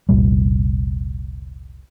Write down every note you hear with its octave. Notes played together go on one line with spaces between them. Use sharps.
F1 C2 A#2 G3